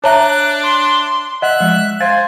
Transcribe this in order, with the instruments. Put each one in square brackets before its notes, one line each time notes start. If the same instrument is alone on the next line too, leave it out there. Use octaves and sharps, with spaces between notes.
[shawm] D4 [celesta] C#5 E5 [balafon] A5 A#5 [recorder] F#6
[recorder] C6
[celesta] D#5 F#5 [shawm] E5 [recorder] F#6
[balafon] F3 G#3
[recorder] C5 [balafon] F5 [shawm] G#5 [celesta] A6